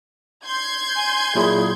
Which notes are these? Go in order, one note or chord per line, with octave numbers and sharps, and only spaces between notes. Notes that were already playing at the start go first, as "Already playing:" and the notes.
C6 G6 G#6
G#5
A#2 F#3 E4 G#4